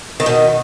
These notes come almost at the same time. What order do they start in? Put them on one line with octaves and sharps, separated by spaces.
D#3 D#4 B2